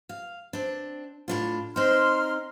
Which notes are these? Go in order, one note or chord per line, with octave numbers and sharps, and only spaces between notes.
F5
C4 D4
A2 D4 F4
C4 D#4 C6 F6